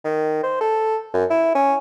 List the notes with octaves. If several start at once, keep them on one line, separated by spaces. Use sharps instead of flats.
D#3
C5
A4
F#2
E4
C#4